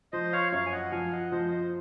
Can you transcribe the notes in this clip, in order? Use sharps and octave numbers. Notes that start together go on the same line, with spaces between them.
F3 C5 D#5
C#5 F5
F#2 C#5 F5
G#5
D#5 F#5
F3 F5 G#5
D#5 F#5
F3 C5 D#5
C5 D#5